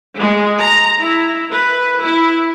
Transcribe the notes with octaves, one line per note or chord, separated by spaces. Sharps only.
G#3
A#5
E4
B4
E4